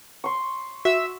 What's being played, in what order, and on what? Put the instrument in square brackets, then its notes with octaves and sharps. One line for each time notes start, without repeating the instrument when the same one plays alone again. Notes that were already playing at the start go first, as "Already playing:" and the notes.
[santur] C6 C#6
[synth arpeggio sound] F#4 [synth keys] E5 E6